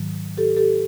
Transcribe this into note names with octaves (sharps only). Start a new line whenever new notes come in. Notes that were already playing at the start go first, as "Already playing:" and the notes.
Already playing: G#2 D#3 F#3
G4 A4
G4 A4